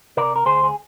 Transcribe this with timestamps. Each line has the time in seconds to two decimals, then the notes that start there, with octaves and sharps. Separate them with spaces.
0.17 C3 A#4 D5
0.36 A#4
0.45 D2 G#4 C5
0.63 G#4